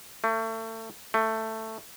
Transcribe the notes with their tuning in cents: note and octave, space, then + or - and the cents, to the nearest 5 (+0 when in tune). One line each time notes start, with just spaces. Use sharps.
A3 +30
A3 +10